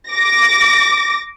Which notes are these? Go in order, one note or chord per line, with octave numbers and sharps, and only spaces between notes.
D6 A#6